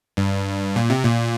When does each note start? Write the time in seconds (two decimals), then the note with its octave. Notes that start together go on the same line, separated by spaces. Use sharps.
0.17 G2
0.76 A#2
0.90 C3
1.05 A#2